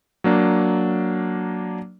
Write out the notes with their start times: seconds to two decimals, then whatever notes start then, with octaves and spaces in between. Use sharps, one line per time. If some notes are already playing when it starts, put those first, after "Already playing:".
0.24 F#3 A#3 D4